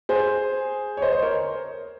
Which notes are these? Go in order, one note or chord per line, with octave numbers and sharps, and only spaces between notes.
G#4 C5
C#5
C5 D#5
C5 D#5
A#4 C#5